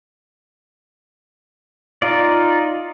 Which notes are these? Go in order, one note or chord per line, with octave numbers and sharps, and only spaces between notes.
D#4 F4 D5